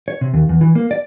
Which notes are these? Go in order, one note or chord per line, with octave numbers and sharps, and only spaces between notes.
C#5
C3
D#2
E2
E3
A#3
D5